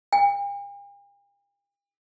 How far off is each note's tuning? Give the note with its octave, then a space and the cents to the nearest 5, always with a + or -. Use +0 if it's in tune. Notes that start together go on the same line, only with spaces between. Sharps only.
G5 +45